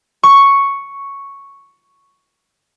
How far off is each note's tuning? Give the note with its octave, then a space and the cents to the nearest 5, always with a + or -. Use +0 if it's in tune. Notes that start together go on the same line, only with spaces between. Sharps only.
C#6 +0